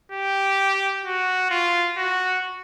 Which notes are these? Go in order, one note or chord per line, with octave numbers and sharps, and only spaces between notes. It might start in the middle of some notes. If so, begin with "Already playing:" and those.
G4
F#4
F4
F#4